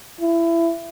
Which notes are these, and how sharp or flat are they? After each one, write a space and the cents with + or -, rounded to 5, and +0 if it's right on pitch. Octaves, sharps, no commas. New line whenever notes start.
E4 +25